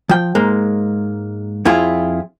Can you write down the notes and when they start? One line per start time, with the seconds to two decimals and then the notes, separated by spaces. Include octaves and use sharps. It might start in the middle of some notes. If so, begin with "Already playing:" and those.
0.09 F3 G5
0.35 G#2 G#3 A#3
1.65 F2 E4 F4 G#4